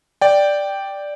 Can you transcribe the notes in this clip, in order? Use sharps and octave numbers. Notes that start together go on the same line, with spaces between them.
D5 G5